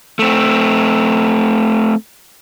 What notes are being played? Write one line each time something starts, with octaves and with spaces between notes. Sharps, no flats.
A3 C4